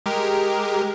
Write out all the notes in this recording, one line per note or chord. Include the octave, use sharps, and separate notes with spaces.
G#3 G4 A#4